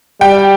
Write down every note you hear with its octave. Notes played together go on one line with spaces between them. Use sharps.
G3 G5